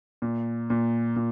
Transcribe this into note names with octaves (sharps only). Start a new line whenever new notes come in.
A#2
A#2
A#2